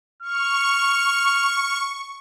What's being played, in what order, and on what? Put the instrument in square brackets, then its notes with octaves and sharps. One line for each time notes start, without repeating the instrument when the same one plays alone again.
[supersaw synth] C#6 [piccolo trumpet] F6